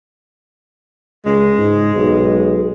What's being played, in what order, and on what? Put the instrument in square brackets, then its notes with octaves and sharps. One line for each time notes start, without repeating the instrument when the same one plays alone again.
[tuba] C#2 [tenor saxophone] G#3
[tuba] G#2
B1